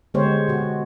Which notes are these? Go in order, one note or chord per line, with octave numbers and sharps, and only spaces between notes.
D3 G#3 B3 G4 C5 C#5
B2 F#4